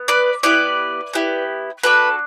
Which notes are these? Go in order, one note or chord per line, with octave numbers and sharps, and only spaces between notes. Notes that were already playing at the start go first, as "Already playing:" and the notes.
Already playing: B3
B4 D5
B3 E4 G4 B4 D5
B3 E4 G4
D4 F#4 A4 B4